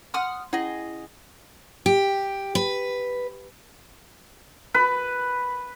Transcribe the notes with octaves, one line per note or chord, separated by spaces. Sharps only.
F#5 C6 D#6 F6
C#4 E4 G#4 D#5 F#5
G4
B4
B4